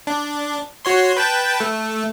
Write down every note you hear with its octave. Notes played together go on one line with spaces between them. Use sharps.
D4
F#4 C#5 C6
B4 G5 A5
A3